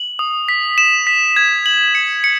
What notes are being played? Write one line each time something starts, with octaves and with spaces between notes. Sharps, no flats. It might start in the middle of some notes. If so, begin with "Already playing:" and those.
Already playing: F#7
D#6
B6
E7
B6
G#6
F#7
C#7
C#7